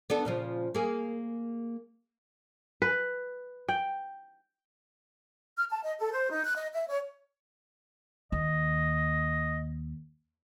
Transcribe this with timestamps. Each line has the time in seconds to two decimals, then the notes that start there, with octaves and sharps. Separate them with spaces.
0.10 B3 D4 A4
0.25 A#2 C#3 F3
0.75 A#3 G#4
2.82 B4
3.69 G5
5.55 F6
5.69 A5
5.83 D#5
5.97 A4
6.12 C5
6.30 D#4
6.43 F#6
6.55 D#5
6.72 E5
6.88 C#5
8.32 D#2 D#5